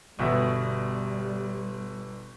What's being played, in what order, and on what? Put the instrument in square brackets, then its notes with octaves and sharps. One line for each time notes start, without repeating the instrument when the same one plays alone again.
[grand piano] G1 B2 E5 [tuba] G3